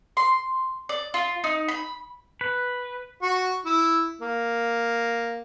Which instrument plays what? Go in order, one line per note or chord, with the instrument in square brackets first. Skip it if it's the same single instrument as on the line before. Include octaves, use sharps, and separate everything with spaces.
[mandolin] C6
D5
F4
D#4
B5
[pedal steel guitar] B4
[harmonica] F#4
E4
A#3